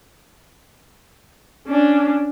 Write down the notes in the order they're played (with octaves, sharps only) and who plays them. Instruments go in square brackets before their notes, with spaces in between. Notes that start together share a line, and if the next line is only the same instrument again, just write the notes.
[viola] C#4 D4